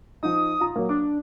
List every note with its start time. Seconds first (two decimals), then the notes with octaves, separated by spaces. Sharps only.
0.23 F3 D#4 D#6
0.60 F4 A#5
0.76 F#3 A#3
0.89 D4 D6